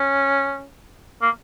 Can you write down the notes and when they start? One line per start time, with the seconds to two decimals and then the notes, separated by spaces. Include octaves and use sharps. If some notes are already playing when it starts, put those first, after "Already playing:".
Already playing: C#4
1.22 A#3